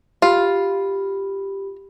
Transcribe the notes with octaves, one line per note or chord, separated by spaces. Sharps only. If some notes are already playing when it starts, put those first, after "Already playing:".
F4 G4 B5